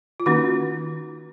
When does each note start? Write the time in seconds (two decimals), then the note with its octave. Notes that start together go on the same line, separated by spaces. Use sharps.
0.20 F4
0.26 D#3 A#3 C#4 D#4 F#4